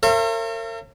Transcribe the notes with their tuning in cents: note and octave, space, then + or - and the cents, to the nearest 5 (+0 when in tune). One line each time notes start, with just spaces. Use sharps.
A#4 -40 C#5 -45 E5 +45